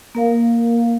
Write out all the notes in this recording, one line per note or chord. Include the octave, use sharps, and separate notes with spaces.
A#3 A#4 F5